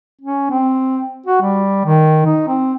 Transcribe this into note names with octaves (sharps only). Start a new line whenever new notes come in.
C#4
C4
F#4
G3
D#3
D#4
C4